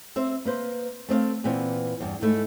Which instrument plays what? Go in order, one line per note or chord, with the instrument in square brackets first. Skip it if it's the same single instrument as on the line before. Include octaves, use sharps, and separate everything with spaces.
[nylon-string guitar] C4 C5 E5
A#3 B4 C5
A3 C4 D#5 F5
A#2 E3 B3 C4
E2 G2
G#2 A3 E4